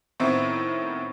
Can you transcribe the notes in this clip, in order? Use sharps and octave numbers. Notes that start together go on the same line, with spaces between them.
A2 D#3 B3 C4 E4